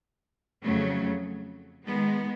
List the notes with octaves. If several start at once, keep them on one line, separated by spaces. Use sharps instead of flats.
F2 C#3 F#3 A3
D#3 G#3 B3